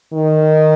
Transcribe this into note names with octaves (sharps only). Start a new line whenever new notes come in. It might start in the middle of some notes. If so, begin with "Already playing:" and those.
D#3